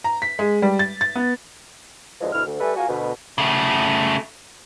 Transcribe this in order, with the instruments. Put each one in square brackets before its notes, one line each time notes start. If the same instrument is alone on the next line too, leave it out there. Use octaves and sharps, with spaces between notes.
[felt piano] A#5
B6
G#3
G3
A6
A6
B3
[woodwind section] F#2 D3 E3 F3 G#3
D2 B2 E4 F6
D2
G3 A3 A4 B4 E5 G#5
A#3 F4 F#4 G#5
D2 B2 B4
[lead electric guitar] C#3 A3